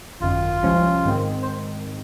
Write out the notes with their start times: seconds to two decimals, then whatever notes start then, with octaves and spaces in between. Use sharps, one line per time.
0.20 G#1 F#2 D#3 F4
0.62 C2 C3 F3 G#3 C#4
1.05 G#2 D#3 G#3 C4
1.43 C5